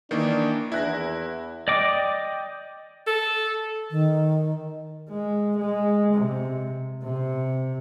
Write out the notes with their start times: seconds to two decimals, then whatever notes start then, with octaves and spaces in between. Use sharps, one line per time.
0.11 D#3 E3 A#3 D4
0.72 E2 E4 F#6 A#6
1.68 D5 D#5 G5 D6
3.07 A4
3.91 D#3
5.09 G#3
5.58 G#3
6.14 C3
7.03 C3